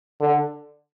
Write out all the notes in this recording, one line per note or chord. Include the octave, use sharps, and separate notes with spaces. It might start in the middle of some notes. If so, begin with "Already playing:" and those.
D3